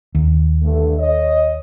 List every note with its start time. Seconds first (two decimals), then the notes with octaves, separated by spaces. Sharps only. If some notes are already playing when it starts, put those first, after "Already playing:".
0.15 D#2
0.63 G2 D3 A3
0.98 C#5 D#5